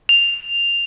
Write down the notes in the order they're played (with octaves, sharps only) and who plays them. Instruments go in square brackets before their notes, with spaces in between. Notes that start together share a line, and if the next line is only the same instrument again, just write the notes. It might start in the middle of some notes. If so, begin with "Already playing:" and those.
[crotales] F7